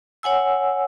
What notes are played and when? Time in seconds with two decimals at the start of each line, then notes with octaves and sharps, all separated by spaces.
0.23 C#5 F#5 G#5 E6